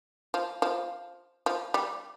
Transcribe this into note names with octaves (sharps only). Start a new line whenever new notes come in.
F3
F3
F3
G3